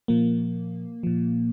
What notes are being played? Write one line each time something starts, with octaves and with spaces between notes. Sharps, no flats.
A#2 F3 A#3
A#2 F3